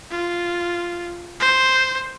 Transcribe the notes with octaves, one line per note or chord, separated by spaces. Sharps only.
F4
C5